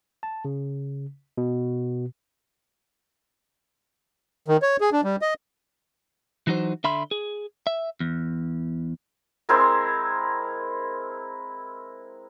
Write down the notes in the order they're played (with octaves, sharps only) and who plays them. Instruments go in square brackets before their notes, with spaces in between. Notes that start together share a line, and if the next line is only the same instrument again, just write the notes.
[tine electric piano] A5
C#3
B2
[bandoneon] D#3
C#5
G#4
D4
G3
D#5
[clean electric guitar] E3 F#3 D#4 F#4 C5
D3 E5 B5 C6
G#4
E5
E2
[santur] G#3 C4 E4 A#4